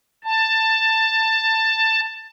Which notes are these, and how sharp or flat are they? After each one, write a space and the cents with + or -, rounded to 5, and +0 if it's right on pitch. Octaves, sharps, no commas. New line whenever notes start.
A5 +15